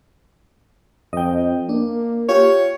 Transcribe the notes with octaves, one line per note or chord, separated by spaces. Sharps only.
F2 D#5 G5
A#3 D4
F4 G4 C#5